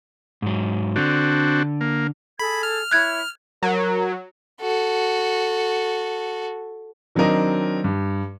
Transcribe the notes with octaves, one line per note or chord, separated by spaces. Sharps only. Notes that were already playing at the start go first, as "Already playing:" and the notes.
G#2 F#3
D3 C4 D4 F#4
A#3
G#4 A4 B5 G#6
F6
E4 C#5 E5 F#6 G#6
F#3 A#4
F#4 A4
D#3 F#3 C4 D4 A#4 D#5
G2